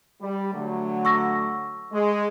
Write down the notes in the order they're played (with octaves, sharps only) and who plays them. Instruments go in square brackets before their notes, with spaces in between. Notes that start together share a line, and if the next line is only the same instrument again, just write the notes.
[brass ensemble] G3
D3 F#3 A3
[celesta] C#6 E6 A#6
[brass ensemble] G#3